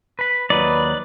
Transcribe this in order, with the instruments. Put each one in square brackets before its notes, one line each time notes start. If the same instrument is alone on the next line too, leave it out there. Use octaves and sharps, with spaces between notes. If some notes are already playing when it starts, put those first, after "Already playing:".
[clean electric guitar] B4 B5
[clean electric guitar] D#2 F#3 D#4 [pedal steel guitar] B4 D5